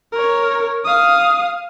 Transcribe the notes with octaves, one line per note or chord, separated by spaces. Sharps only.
A#4 C#5
F5 D#6